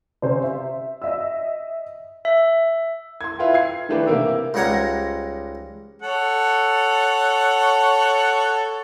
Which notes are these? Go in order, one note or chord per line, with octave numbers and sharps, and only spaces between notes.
C3 C#4 C5
E5
D#5 E5 E6
E5
C6 G#6
E4 F4 B4 G5
G#6 C7
D#3 E3 A3 D4 G4 B4
C3 A#3 E4 A#4 E6
C#2 G#2 G3 C#5 F#5 A#5
A4 C#5 F#5